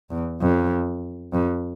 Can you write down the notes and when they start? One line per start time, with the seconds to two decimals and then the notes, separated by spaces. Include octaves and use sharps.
0.10 E2
0.41 F2
1.33 F2